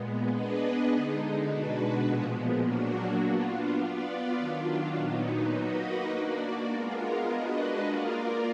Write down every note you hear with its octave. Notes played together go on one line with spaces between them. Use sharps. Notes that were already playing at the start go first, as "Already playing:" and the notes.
Already playing: A#2 G#3 B3
B3 D4 G#4 B4 D#5
D3 G#3 D#4
B2 G#3 D4 F#4 B4
A#2 F3 G#3 B3
A#2 F#3 A#3 D4 F#4
B3 D4 F4
B3 F4 B4 D5
D#3 F#3 D4 F4
A#2 F#3 B3 D#4
A#3 D#4 F#4 B4 D#5
A#3 D4 F#4 D5
G#3 B3 F4 A#4
G#3 D4 F#4 B4 D#5
A#3 F4 A#4 D5